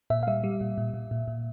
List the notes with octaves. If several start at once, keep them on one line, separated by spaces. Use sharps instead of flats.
A#2 E5
F5
G3 E5
G3
A#2
A#2
A#2
A#2
A#2